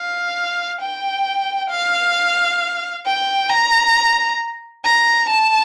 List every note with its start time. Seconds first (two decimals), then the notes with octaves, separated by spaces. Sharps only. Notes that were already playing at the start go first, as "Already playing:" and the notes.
Already playing: F5
0.81 G5
1.70 F5
3.06 G5
3.50 A#5
4.84 A#5
5.29 A5